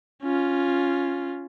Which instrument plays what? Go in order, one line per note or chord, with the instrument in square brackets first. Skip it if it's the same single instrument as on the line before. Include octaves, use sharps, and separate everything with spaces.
[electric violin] C#4 F4